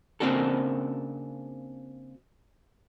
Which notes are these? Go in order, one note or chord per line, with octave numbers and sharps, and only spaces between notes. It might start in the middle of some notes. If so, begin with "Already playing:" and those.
C#3 A#3 C4 D4 F#4 A4